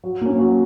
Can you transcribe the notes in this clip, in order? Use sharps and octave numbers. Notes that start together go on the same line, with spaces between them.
F#3
A#3 C#4
F#3